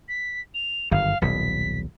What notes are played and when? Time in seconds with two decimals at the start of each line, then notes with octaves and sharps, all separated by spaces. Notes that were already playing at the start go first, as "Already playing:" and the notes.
0.08 B6
0.54 F7
0.91 G1 F#2 D#3 F5
1.22 D#1 B1 B6